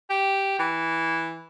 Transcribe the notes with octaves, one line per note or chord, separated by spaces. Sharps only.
G4
E3